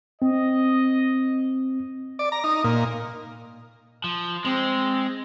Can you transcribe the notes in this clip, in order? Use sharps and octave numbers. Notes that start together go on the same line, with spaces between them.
C4 D#5
D5
A#5
D#4
A#2
F3
G#3 C4